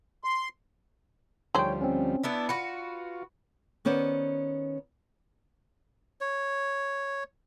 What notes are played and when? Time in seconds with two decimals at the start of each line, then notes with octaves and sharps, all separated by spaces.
0.24 C6
1.55 D2 D#3 F3 G3 G#4 C5 C#5 G5
1.81 C4 C#4
2.23 B3 D4 E4
2.49 F4 F#4 B4 C#7
3.85 D#3 B3 C#4 C5 D5
6.21 C#5